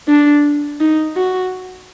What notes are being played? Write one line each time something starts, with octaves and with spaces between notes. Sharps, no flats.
D4
D#4
F#4